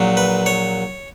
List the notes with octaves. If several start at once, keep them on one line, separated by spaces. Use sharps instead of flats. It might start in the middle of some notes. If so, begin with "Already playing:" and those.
Already playing: A#1 A#2 F#3
B4
C#5